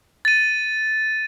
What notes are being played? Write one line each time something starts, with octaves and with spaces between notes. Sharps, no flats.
A6 D#7